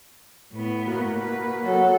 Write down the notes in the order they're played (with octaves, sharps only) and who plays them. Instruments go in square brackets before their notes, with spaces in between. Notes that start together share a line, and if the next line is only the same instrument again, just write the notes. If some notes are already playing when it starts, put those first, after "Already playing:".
[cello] A2 B3
[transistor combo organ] A#3 F#4
[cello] B4
[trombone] F#3 [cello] A4